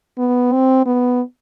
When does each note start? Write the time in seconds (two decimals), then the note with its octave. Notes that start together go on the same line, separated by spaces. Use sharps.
0.18 B3
0.53 C4
0.86 B3